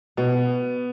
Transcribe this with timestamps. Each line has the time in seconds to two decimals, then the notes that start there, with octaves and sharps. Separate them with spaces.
0.17 B2 B3